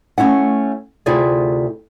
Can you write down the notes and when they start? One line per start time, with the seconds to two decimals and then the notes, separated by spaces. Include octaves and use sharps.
0.18 A3 C#4 E4 F#5
1.06 D2 C3 E4 F4 G#4 D5